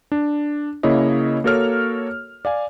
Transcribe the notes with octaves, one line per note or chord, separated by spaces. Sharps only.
D4
C#3 A#3 E4 C#5 D#5
A#3 F#4 A4 A#4 C#5 F6
D5 F5 G#5